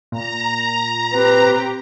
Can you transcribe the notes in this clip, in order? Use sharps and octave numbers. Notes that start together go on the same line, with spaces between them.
A#2 A#5
C4 G4 B4